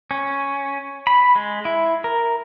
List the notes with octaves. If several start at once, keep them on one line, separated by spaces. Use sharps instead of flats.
C#4
B5
G#3
E4
A#4